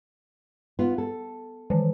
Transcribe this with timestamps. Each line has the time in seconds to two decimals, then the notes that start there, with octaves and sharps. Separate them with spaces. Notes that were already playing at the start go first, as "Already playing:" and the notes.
0.79 B3 F4
0.98 A4
1.70 D#3 E3